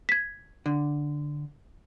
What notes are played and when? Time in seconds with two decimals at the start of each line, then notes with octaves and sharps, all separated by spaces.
0.09 G#6 B6
0.66 D3